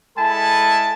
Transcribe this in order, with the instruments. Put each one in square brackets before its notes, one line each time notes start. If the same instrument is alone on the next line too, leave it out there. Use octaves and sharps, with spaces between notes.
[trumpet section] G#3 E4 A4 G#5 A5 B5